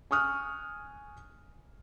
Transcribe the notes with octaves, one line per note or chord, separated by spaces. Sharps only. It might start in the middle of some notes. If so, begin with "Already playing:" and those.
G#5 C#6 D#6 F6 F#6